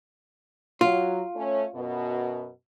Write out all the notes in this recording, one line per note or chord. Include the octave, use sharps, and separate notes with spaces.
F#3 F4
A3 C#4
F#2 B2